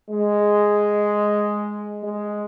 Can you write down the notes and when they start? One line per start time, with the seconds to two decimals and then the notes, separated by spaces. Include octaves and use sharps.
0.10 G#3
2.04 G#3